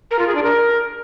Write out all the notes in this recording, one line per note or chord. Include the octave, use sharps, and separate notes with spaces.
A#4
F4
G#4
D4
A#4